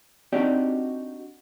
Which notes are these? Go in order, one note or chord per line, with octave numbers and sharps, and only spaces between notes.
C4 D4 D#4 F#4 G4 D5